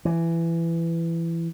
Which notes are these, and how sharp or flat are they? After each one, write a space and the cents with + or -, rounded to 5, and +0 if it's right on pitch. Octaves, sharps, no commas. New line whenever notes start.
E3 +15